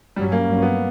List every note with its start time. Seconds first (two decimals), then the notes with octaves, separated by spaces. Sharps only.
0.16 G2 F#3 G3 C#4
0.32 A#3
0.47 G2 F#3 A#3 C#4
0.62 B3